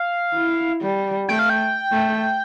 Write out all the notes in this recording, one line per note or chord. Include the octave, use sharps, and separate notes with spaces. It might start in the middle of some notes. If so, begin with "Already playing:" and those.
Already playing: F5
E4
G3
A3 G5
F5
G5
A3